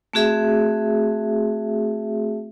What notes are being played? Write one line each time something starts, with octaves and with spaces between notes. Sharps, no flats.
A3 C4 F#4 G#4 E5